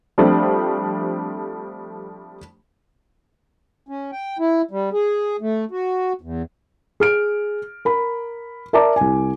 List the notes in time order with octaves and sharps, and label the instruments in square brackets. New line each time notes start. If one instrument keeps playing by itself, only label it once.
[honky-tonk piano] F3 G3 A3 C4 D4
[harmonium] C#4
G5
E4
G3
G#4
A3
F#4
E2
[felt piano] G#4 F6 D7
A#4 B5
A#4 D5 E5 A5 A#5 D6
C2 G#5